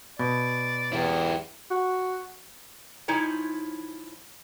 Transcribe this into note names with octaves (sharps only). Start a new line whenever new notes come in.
B2 D5
E2 E4 G4
F#4
F3 D#4 E4 C#5 G#5